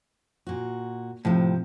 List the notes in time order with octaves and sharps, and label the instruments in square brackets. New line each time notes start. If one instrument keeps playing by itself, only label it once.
[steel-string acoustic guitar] A#2 F#4
[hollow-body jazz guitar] A2 [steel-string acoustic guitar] C3 F3